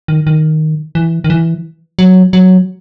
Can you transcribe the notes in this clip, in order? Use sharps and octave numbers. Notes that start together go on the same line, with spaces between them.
D#3
D#3
E3
D#3
E3
F#3
F#3